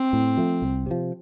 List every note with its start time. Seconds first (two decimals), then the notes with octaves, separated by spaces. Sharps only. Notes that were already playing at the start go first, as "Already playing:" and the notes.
Already playing: C4
0.13 A2
0.38 F3 A3
0.62 C2
0.86 C3 F3